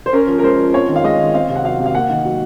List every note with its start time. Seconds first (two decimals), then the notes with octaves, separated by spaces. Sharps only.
0.06 C5
0.13 C#4 A#4
0.28 F3
0.39 A#4
0.43 G#3 C5
0.58 F3
0.73 C4 C#5
0.89 D#3
0.96 F5
1.04 G#3 D#5
1.19 D#3
1.34 C4 F5
1.49 C3
1.56 F#5
1.64 F#3 F5
1.79 C3
1.86 F5
1.95 A#3 F#5
2.10 D#3
2.25 F#3